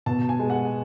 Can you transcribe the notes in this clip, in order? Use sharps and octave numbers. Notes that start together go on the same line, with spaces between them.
B2 A5
G#5
G#3 B3
F#5